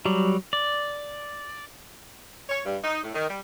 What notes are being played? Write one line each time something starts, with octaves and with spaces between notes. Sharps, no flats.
F#3 G3
D5
C#5
G2
D#4
A2
D#3
G3